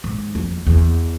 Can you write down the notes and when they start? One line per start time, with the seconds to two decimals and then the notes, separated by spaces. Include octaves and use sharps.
0.04 G#2
0.35 F2
0.67 E2